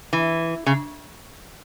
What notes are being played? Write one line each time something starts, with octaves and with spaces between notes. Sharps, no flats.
E3
C#3